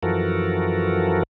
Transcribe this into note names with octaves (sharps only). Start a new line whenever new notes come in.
F#2 E3 F3 F#4 A4 A#4